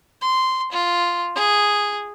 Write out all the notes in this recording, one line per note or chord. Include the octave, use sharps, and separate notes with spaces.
C6
F4
G#4